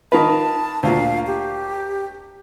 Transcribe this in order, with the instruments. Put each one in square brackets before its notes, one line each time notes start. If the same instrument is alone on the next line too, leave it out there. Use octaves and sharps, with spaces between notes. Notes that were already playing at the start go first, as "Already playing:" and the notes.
[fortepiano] D#3 F4 B4 [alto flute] A5
[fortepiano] D2 A#2 [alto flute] F5
[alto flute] G4